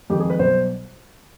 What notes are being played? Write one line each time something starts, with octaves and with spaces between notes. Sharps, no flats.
F2 D#3 G#3 G4
G#4
B4
B1 B2 G3 C5